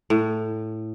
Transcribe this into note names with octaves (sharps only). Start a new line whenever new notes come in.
A2